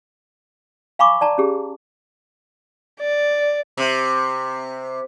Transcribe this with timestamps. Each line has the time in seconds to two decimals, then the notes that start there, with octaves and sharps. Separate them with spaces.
0.99 F5 G#5 B5 C#6 D6
1.21 D5 A5 A#5
1.38 C#4 G4 G#4
3.01 D5
3.77 C3